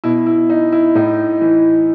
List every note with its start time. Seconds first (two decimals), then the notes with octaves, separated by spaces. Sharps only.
0.04 B2 E4
0.27 E4
0.50 D#4
0.72 E4
0.95 A2 D#4
1.41 E3